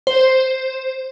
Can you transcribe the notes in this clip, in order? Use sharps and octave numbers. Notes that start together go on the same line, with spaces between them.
C5